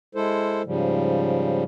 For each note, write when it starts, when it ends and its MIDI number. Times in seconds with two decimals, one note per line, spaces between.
0.15 0.62 56
0.15 0.62 64
0.15 0.62 69
0.15 0.62 72
0.65 1.64 44
0.65 1.64 49
0.65 1.64 53
0.65 1.64 55